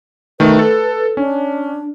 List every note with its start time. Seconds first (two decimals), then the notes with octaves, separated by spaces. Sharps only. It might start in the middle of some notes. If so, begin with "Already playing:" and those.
0.40 D#3 A3 B4
0.59 A4
1.17 C#4 D4